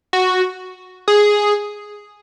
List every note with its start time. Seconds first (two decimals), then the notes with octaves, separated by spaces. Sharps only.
0.13 F#4
1.08 G#4